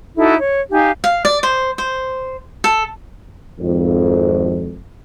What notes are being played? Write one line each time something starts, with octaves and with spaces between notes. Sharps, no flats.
D#4 E4 F#4 A4
C#5
D#4 G4 F5 G#5
F5
D5
C5
C5
A4
G#1 F2